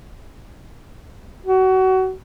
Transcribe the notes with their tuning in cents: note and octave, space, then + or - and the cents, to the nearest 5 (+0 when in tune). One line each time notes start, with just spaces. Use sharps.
F#4 +25